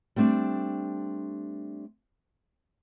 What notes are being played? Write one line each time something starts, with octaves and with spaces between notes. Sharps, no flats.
G3 A3 C4 D4